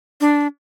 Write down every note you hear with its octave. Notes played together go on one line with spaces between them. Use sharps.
D4